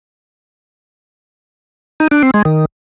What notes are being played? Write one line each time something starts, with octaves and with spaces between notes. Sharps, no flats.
D#4
D4
C4
G#3
D#3